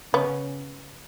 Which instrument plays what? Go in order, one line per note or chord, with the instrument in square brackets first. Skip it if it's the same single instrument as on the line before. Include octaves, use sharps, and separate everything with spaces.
[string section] C#3 C#4 [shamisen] B3